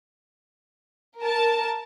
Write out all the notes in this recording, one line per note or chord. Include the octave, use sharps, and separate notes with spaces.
A#4 A5